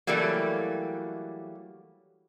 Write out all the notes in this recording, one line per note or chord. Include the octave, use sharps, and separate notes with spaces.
E3 F#3 G3 A3 A#3